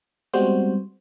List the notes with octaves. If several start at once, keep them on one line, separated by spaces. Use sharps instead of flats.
G3 G#3 B3 C4 F#4 C5